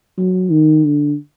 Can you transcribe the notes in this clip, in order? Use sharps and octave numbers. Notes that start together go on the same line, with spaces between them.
F#3
D#3
D3